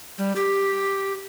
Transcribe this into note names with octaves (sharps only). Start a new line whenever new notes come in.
G3
G4